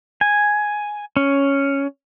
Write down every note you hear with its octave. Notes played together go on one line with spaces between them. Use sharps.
G#5
C#4